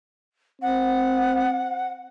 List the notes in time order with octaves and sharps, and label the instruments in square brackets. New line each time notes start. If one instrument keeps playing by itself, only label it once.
[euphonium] C4 [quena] F#5